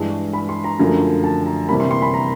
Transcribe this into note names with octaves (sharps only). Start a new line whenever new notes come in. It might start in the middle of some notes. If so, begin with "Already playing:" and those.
Already playing: G2 E3 G#3
B5
C6
A#5
F#2 D3 F3 A3
A5
A#5
C3 E3 G3 A#3 B5
C6
C6
B5
A#5